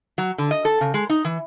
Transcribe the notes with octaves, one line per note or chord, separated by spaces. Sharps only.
F#3
D3
D#5
A4
C#3
G#3
D#4
E3